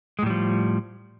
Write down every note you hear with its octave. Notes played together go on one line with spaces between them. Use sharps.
A2 F3 G3 G#3